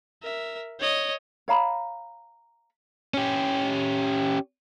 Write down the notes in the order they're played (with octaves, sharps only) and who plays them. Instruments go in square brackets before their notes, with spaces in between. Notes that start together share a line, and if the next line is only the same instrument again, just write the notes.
[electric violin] A#4 E5
C#5 D#5
[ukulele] C#5 F5 A#5 B5
[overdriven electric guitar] C#4 G4